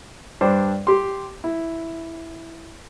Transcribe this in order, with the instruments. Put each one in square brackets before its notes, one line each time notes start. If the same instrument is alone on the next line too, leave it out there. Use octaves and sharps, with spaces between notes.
[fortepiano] G2 D4 C5
G4 C6
E4